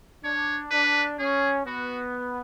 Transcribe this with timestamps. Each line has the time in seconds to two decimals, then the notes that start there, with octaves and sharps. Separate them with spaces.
0.24 D4 C#5
0.71 D4 B4
1.19 C#4 G#4
1.66 B3 F#4